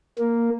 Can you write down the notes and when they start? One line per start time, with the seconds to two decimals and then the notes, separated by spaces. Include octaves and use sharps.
0.19 A#3